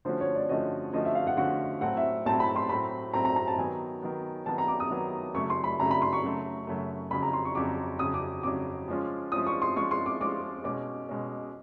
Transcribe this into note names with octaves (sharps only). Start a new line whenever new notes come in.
D3 F3 A3 C#4 F#4 C5
C#5
D5
D3 F3 A3 C#4 F#4 D#5
D3 F3 A3 C#4 F#4 D#5
E5
F5
F#5
D3 F3 A3 C#4 F#4 F#5
A2 F#3 A3 C4 F#5
E5
A2 F#3 A3 C4 A5
B5
C6
A2 F#3 A3 C4 B5
A2 F#3 A3 C4 A#5
A#5
A#5
A5
D#3 F#3 B3 G#5
D#3 F#3 B3
D#3 F#3 B3 A5
A#5
D6
D#6
D#3 F#3 B3
F#2 C#3 F#3 A3 C#6
C6
B5
F#2 C#3 F#3 A3 A#5
B5
C6
C#6
F#2 C#3 F#3 A3
F#2 C#3 F#3 A3
F2 C#3 F#3 B5
A#5
C6
C#6
F2 C#3 F#3 D6
F2 C#3 F#3 D#6
D6
F2 C#3 F#3 D6
F3 G#3 C#4 F4
F3 G#3 C#4 F4 D#6
C#6
C6
F3 G#3 C#4 F4 C#6
C6
D6
F3 G#3 C#4 F4 D6
B2 G#3 C#4 D6
B2 G#3 C#4